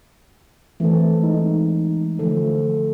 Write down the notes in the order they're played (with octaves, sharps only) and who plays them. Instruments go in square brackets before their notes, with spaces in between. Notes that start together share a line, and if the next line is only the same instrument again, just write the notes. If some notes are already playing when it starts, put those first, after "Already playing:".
[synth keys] E3 [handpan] A3 C4 A4
[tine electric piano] G#3 D#4
[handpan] D3 F3 A3 [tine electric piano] A4